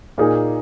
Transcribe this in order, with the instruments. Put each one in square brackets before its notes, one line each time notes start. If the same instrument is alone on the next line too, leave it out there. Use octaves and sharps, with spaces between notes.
[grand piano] A#2 A#3 D#4 G#4